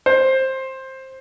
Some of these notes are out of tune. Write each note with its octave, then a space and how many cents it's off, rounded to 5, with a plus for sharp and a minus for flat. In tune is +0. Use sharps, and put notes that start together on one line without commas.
C5 +15